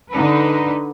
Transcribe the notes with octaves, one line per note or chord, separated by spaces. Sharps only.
D3 D#4 B4